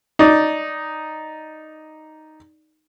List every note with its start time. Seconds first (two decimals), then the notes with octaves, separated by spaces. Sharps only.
0.19 D#4 D5